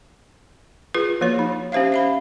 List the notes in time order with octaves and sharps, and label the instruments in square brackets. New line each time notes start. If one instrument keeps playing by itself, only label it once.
[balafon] F4 G#4 B4
F3 A#3 F#4 C#5
D#4
C#4 G4 C5 E5 F5
E5 F5 B5